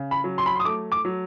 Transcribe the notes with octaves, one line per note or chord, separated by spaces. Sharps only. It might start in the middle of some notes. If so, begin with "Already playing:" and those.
Already playing: C#3
B5
F#3
C6
B5
C6
D#6
A3 D6
D6
F#3